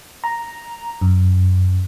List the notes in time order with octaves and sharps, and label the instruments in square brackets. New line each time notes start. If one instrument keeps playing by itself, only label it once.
[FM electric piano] A#5
F#2